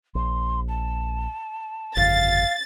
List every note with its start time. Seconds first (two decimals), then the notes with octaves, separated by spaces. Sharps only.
0.15 A#1 C6
0.68 A5
1.97 G1 F2 C#3 F5 A6